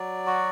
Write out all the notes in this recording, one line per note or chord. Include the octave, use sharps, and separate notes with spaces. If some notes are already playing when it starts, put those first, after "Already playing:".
Already playing: F#3 D5
F#4